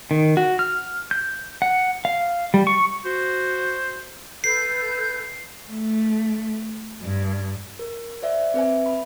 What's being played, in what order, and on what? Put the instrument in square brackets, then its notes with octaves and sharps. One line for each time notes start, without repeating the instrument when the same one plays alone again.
[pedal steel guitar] D#3
F#4
F6
G6
F#5
F5
G3
C#6
[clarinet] F#4 [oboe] C5
[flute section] A4 B4 G6 [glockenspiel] C7
[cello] A3
G2
[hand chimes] A#4
C5 D5 E5
C4 B4 E5 G#5
B5